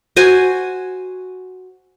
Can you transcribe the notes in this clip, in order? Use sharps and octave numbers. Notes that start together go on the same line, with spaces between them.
F#4 C5 G#5